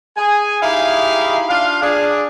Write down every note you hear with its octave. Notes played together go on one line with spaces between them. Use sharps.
G#4 G#5
D#4 E4 G4 G#4 F5
D4 F4 F5
D4 G#4